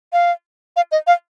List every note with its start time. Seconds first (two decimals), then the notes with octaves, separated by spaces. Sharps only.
0.13 F5
0.76 F5
0.92 D#5
1.07 F5